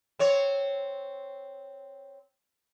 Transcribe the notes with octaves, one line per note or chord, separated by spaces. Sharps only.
C4 C#5